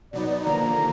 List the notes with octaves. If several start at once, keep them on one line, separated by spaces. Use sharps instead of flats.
B2 F#3 B3 D#4 D5
D5
D#2 D3 F3 A#3 A#5